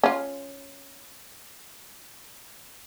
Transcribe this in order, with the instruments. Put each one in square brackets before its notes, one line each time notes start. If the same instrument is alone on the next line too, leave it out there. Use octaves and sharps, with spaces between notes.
[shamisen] C#4 F4